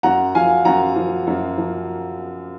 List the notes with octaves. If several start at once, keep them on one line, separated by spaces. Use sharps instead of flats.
F#2 F#5 A#5
F3 F5 G#5
F#2 F#5 A#5
F3
F#2
F3